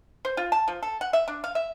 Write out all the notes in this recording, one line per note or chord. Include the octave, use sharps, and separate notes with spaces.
C5
F4
A5
F3
A4
F#5
E5
D4
F5
E5